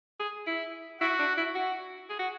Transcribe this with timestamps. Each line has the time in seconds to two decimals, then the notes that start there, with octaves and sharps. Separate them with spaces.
0.20 G#4
0.46 E4
1.00 E4 F#4
1.19 D4
1.37 E4
1.55 F#4
2.09 G#4
2.19 F#4